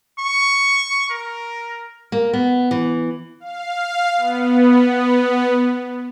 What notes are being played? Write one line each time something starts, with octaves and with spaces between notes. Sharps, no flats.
C#6
A#4
A#3
B3
E3
F5
B3